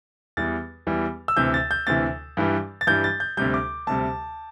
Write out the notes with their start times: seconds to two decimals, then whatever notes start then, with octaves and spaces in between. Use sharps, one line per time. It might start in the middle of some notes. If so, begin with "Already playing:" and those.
0.37 E2 E3 G3 A6
0.87 E2 E3 G3
1.28 E6
1.37 D2 C3 E3 G6
1.54 A6
1.71 G6
1.87 D2 C3 E3 A6
2.37 G2 E3 G3
2.81 A6
2.87 G2 E3 G3 G6
3.04 A6
3.20 G6
3.37 D2 C3 G3 G6
3.54 D6
3.87 D2 C3 G3 A5